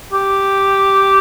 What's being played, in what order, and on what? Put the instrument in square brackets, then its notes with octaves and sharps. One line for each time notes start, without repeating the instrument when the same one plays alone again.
[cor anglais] G4